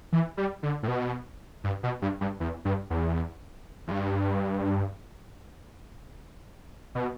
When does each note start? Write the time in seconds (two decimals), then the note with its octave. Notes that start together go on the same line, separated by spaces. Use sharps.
0.12 E3
0.37 G3
0.63 D3
0.83 A2
0.88 B2
1.64 G2
1.83 B2
2.02 G2
2.21 G2
2.40 E2
2.65 G2
2.90 E2
3.88 E2
3.91 G2
6.95 B2